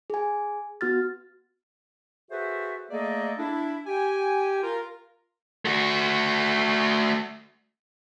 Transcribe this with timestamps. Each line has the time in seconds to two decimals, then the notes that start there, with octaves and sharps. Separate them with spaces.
0.10 G#4 G#5
0.81 B3 F#4 F6 A6
2.30 F#4 G#4 A4 B4 C5 E5
2.91 A3 A#3 G#4 A4 D5 D#5
3.38 D4 E4
3.87 G4 G5 G#5
4.62 F4 A#4
5.65 A3 F#4